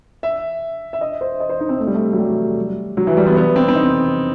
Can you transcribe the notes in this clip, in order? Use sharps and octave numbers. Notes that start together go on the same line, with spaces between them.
E5
E5
D#5
C5
D#5
C5
D#4
C4
A3
G3
A3
F#3
G3
F#3
E3
G3
B3
B3
C4
C4
D#4